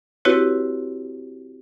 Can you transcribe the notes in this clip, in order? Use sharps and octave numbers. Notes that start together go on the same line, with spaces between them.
C4 E4 F#4 G4 B4 C#5